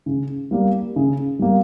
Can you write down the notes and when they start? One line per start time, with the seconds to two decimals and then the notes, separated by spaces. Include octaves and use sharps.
0.06 C#3
0.51 G3 A#3
0.96 C#3
1.39 G3 A#3